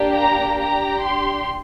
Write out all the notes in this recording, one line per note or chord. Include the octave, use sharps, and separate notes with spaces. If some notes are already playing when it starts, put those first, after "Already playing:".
Already playing: A#3 D4 G4
A#5
D4 G4 A#5
C6